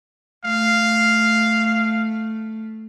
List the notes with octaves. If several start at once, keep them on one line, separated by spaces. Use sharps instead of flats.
A3 F5